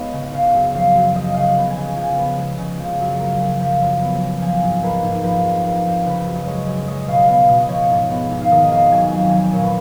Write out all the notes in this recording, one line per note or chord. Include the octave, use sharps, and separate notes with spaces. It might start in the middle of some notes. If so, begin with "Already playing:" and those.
Already playing: G#2 G#3 B3 C#5 D#5 F5
C#3
F#5
C#3 F5
F#2
F3 F5
F#2
F3 D#5
C#3 F5
F#5
B3
G#5
C#3
F3 G#5
B3
G#3
C#3
F3
F#2
A#3
F#2
F3
F#2
B3
F#2
F3 G#5
G#2
A#3 B4
G#2
F3 B4
F2
A#3
F2
C#3 B4
F#2
D#5
G#3 C#5
F#2
C#5
G#3 D#5
B2 F5
B3 F5
B2 D#5
F3 C#5
G#2
B3 F#5
G#2
F5
D#3 D#5
F2 F5
F#3 G#5
F2 G#5
F3 G#5
A#2 C#5
B4